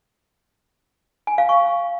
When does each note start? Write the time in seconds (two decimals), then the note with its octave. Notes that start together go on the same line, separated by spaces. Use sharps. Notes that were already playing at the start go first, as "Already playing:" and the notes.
1.27 G#5
1.38 F5
1.49 C#6